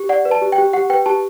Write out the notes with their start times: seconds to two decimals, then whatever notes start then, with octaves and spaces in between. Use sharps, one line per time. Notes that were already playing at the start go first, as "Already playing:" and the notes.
Already playing: G4
0.09 D5 F#5
0.25 B4
0.31 A5
0.42 G4
0.52 G5
0.58 G4
0.73 G4 F#5
0.90 B4 G5
1.06 G4 A5